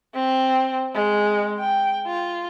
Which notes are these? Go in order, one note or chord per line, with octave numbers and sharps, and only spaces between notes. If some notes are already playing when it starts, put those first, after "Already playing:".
C4
G#3
G5
F4